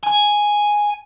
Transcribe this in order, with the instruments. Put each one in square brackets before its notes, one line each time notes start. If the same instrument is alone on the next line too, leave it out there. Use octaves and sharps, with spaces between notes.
[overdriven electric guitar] G#5